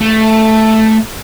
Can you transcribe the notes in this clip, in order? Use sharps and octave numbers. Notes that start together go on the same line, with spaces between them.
A3